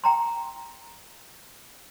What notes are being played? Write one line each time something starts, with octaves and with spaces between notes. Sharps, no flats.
G5 A#5 C6